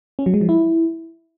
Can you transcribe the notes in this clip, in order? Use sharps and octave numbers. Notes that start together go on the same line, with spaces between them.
C#4
F#3
G#3
F3
E4